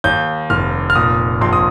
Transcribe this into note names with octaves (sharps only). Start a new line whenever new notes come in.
D#2 G6
F1 F6
F6
A#2 D#6
A#1 C6
D#6